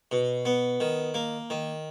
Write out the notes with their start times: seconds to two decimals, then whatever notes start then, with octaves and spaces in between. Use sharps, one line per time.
0.11 B2
0.45 B3
0.80 D#3
1.14 A#3
1.50 D#3